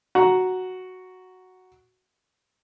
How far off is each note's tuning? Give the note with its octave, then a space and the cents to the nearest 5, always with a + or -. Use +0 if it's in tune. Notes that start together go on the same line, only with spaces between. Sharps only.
F#4 +0 A#5 +0